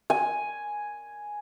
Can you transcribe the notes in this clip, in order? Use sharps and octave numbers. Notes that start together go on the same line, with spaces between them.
G#5